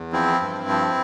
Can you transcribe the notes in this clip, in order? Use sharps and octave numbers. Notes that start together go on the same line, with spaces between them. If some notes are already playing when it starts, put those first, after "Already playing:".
Already playing: E2
F3 C4 E4
G2
F3